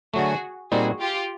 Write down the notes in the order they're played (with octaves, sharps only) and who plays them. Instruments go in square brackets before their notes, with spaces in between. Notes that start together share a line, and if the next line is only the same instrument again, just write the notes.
[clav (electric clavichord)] D3 F#3 A3 [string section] F#4 G#4
[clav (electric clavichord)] A#2 G3 C4 D#4 [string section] F#4 G#4
[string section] F4 G4